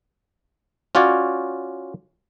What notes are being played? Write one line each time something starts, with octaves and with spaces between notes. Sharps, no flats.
C#4 F4 F#4 C#5 D5